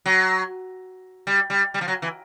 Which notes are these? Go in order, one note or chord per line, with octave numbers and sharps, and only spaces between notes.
F#3
G3
G3
G3
F3
F#3
E3